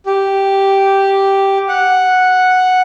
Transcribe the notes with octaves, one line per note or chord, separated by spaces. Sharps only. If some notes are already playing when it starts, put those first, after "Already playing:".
G4
F#5